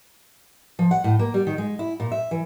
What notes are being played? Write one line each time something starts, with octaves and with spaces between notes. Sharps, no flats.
F3
F#5
A2
A#3
G3
D#3
G#3
E4
A#2
E5
E3